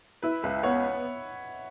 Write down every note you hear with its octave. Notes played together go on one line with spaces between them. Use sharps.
E4 B4
C#2 B4 E5
B3 C#5 F#5